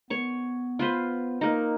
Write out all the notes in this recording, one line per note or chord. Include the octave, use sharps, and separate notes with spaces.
B3 C#5 C#6
F4 B4 C5
A#3 D#4